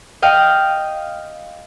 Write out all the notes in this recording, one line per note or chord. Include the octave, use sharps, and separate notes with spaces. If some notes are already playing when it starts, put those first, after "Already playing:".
D#5 F5 G5